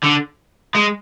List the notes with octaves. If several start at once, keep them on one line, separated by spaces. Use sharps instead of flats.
D3
G#3